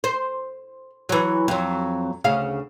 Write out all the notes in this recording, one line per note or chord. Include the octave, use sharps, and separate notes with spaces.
C5
E3 F#3
F2 F#3
D2 C#3 F5